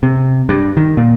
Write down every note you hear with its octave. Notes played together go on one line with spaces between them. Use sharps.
C3
G2
D#3
A#2